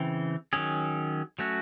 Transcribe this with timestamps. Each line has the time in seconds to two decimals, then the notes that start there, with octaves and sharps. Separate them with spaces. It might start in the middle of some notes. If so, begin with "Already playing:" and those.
Already playing: C#3 E3 C4
0.53 D#3 F#3 C#4 G#4
1.39 F#3 A3 C#4 F#4